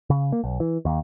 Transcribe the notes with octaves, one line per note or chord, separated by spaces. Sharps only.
C#3
A#3
B1
E3
D#2